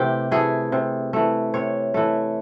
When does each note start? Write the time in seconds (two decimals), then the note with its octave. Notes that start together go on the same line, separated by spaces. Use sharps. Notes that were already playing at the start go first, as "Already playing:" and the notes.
Already playing: C3 E3 A3 G4
0.31 E3 A3 G#4
0.72 C3
1.13 E3 A3
1.54 C3 C#5
1.94 E3 A3